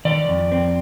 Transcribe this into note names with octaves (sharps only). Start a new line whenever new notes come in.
D#3 D5
F2
C4